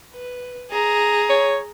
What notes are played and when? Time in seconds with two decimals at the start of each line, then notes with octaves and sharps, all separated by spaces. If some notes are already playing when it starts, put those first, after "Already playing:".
0.13 B4
0.71 G#4 A#5
1.29 C#5